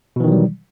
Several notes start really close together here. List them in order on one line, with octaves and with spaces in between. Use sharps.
B2 E3 D#3 F#3 G3